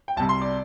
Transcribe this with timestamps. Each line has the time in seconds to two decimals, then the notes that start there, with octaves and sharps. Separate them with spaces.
0.08 G5
0.16 C2 C3 G3 A5
0.29 C6
0.41 D5